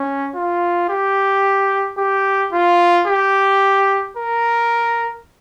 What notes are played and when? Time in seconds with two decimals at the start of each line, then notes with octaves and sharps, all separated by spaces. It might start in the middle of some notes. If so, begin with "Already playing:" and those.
Already playing: C#4
0.35 F4
0.89 G4
1.98 G4
2.53 F4
3.07 G4
4.17 A#4